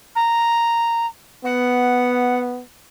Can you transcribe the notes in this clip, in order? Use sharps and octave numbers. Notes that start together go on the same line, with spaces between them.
A#5
B3 F#5